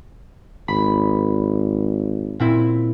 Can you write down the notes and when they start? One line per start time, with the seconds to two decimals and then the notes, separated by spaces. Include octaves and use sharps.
0.68 G#1 B5
2.40 A#2 C4 E4